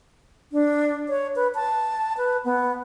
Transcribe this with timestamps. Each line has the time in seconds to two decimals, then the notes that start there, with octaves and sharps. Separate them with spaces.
0.52 D4
1.09 C#5
1.36 B4
1.55 A5
2.18 B4
2.45 B3